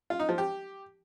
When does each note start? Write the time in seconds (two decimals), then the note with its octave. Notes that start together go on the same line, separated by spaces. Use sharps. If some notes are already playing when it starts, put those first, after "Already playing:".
0.10 F4
0.20 D#4
0.29 F3
0.38 G4